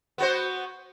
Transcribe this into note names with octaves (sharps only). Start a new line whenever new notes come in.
B3 F#4 C5